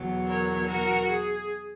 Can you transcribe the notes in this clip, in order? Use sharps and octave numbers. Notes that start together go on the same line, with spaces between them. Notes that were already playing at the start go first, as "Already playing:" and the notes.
Already playing: E2 B2 F#3
A#4 C#5
F#4 A#4
G#4